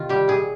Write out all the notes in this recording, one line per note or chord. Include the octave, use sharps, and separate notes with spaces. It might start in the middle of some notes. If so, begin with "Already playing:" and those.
Already playing: C3 D#3 F4
G3 G4
A#2 G#4